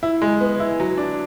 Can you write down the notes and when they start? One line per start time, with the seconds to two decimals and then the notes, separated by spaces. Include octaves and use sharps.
0.03 E4
0.22 G#3
0.41 B3
0.60 E4
0.80 F#3
0.98 D4